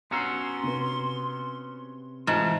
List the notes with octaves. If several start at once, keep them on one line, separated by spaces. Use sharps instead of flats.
B3 C#4 F#4 A#5 C6 E6 C7
C3 B4
G#2 E3 A3 F4 A5